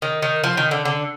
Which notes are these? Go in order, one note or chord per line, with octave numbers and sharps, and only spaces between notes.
D#3
D#3
F3
D#3
D3
D3